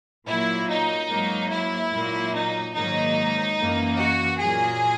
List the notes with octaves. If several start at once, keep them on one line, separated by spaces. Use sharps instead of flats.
A#2 F#3 A#3 E4
D#4
G#2 F#3 A#3
E4
A#2 F#3 A#3
D#4
G#2 D#3 F#3 A#3 D#4
F#2 E3 A#3
F#4
A#2 F#3 A#3 G#4